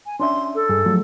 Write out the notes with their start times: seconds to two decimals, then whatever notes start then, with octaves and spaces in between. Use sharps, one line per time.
0.06 G#5
0.20 C#4 D4 E5 C6
0.55 A4
0.69 G2 G#4
0.86 F3 F#3 A3